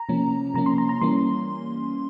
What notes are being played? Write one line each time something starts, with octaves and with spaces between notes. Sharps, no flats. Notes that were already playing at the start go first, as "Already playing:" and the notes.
Already playing: A#5
C3 F3 A#3 C#4
C3 F3 A#3 C#4 A#5
C6
A#5
A#5
E3 G3 A#3 C#4 C6